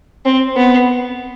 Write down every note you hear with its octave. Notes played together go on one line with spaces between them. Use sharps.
C4
B3